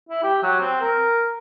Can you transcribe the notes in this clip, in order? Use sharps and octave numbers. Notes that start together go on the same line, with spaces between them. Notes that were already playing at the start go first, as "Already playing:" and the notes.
E4
G4
F#3
C4
A#4